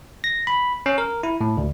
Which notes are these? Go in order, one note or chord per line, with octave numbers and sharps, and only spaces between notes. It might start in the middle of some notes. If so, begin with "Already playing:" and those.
A#6
B5
C#4
A#4
E4
A2
D2